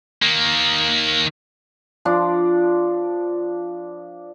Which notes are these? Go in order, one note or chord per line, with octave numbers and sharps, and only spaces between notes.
D#3 A#3
F3 D4